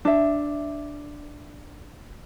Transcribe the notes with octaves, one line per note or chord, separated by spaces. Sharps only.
D4 E5